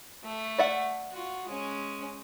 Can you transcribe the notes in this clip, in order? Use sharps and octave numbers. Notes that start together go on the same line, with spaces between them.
A3
D5 E5 F#5
F4 F#4
G#3 C#4